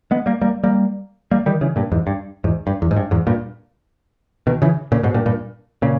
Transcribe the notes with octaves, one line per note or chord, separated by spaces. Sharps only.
G#3 B3
G3 A#3
G3 A#3
G3 A#3
G3 A#3
D#3 G3
C#3 E3
G2 A#2
E2 G#2
G2
E2 G#2
G2
E2
G#2
G2
E2 G#2
G2 A#2
B2 D#3
C#3 E3
A#2 C#3
G#2 B2
G2 A#2
G2 A#2
A#2 C#3